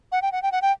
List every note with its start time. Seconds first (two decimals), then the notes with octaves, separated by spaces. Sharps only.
0.12 F#5
0.22 G5
0.32 F#5
0.42 G5
0.52 F#5
0.62 G5